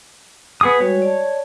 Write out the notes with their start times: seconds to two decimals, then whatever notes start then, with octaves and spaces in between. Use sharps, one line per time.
0.61 B3 G#4 B4 F#5 D#6
0.81 G3 G#3 F#4 C#5
1.02 D5 A5